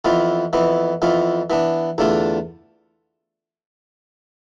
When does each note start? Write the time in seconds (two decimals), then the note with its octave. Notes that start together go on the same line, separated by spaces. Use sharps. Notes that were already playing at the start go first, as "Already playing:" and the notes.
0.05 F2 E3 B3 F4
0.53 F2 E3 B3
1.02 F2 E3 B3 F4
1.50 E3 B3 D4
1.98 E2 D3 A3 D4 F4